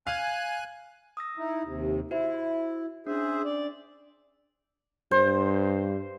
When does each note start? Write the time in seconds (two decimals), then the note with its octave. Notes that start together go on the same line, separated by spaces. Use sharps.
0.07 F5 G#5 F#6
1.17 D#6 E6 A#6
1.37 D#4 E4
1.64 D#2 C3
2.11 E4 F#4 C5 E5
3.07 C#4 D4 G#4 C5 E5
3.45 D5
5.11 G2 C5